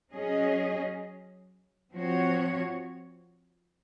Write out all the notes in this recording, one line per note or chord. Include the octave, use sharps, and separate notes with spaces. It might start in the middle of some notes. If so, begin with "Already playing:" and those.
F#3 C#4 G#4 D#5
F3 C4 F#4 C#5